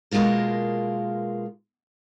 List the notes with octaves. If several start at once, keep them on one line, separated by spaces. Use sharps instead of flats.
B2 G#3 A#3 F4 A#4